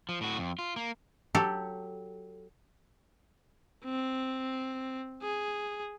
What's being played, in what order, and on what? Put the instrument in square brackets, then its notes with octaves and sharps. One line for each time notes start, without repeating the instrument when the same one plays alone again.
[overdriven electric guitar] F3
A2 F#4
F2
F4
A#3
[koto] F#3 G4 A4
[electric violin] C4
G#4